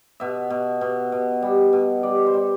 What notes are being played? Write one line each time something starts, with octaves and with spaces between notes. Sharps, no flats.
B2 E5
B2
B2
B2
G3
B2
G3 D5
C5
G3